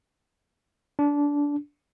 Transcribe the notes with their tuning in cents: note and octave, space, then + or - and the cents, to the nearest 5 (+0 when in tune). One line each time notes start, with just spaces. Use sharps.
D4 -20